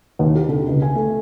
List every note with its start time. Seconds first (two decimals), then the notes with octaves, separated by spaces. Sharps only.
0.19 D#2
0.35 G4
0.49 D3
0.68 C#2
0.82 G#5
0.95 A3